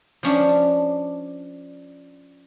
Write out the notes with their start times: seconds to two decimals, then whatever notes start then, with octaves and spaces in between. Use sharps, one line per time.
0.23 F3 C#4 D4